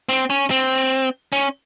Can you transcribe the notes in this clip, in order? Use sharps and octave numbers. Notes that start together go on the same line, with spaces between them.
C4
C#4
C4
C#4